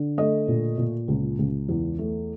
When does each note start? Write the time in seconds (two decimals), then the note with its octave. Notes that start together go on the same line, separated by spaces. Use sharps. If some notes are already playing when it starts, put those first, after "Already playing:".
Already playing: D3
0.18 A3 D#5
0.48 A#2
0.78 A#2
1.08 C#2
1.39 C#2
1.69 E2
1.99 A3